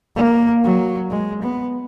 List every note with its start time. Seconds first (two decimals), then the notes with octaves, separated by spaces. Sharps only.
0.16 A#3
0.64 F#3
1.10 G#3
1.42 B3